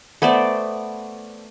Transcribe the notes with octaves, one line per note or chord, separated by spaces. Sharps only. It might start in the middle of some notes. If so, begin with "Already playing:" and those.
A3 B3 C5 D5